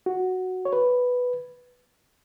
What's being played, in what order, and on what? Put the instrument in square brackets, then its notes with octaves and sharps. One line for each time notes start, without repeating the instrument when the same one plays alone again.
[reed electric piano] F#4
C#5
B4